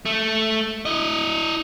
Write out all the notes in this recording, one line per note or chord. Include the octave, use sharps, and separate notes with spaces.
A3
E4 D#5